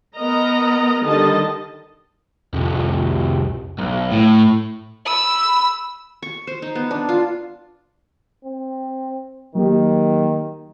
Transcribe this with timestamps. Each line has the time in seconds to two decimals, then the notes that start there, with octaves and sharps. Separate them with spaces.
0.16 B3 A#4 D#5 A#5
1.04 D3 D#3 G3 D#5 A5
2.54 C2 F2
3.79 B1
4.12 A2
5.07 B5 E6
6.22 C#6
6.47 C5
6.62 D#4
6.75 B3
6.91 D4
7.09 F4
8.45 C4
9.55 D#3 F#3 A#3 G4